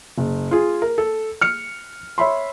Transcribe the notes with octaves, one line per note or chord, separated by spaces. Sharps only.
F#1
F4 G#4
A#4
A4
F6 C#7
C#5 E5 B5 C6